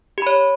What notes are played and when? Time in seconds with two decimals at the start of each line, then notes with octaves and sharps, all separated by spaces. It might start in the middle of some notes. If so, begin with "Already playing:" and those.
0.18 G4
0.22 B5
0.27 C#5